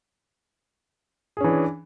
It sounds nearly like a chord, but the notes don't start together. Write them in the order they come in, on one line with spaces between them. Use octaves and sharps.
G#4 C#4 E3 D4